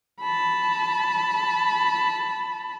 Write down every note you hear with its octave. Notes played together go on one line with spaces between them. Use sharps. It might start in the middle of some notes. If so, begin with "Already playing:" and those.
A5 B5